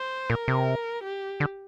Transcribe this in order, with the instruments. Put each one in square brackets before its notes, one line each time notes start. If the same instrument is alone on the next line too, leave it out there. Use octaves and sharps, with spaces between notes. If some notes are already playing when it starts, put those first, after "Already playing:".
Already playing: [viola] C5
[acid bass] A#2 [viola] A#4
[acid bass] C3
[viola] G4
[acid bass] D3